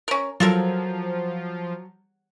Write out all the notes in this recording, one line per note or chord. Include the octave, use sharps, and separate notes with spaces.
C#4 A#4
F3 F#3 F4 A4 A#4